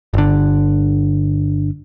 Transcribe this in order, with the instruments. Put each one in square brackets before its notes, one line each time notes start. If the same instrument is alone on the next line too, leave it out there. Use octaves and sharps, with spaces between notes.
[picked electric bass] G1 D3